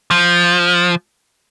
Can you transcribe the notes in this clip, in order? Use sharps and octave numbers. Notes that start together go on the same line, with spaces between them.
F3